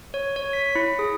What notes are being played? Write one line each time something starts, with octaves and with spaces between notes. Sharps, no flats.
C#5
C#5
B6
E4
G#4